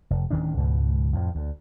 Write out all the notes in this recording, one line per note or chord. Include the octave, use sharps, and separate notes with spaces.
F1
D1 D#3 C#4 D4
C#2 G#2 B2
F2 A2 F3
D2